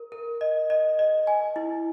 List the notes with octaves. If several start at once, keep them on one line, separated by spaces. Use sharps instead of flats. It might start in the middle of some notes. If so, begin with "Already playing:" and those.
Already playing: A#4
A#4
D#5
D#5
D#5
G#5
E4